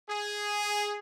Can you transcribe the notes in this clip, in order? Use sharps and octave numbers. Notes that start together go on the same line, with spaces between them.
G#4